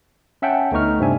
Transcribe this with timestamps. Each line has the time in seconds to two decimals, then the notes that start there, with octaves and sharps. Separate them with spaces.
0.42 C#4 E5 F#5 G5 A5
0.71 D2 A3 B3 D#4 C#6 F6
0.99 G2 C3 C4 D4 E5 G#5